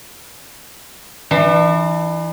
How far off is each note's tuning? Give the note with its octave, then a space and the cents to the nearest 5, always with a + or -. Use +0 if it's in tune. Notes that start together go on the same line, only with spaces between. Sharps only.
E3 +0 D4 +40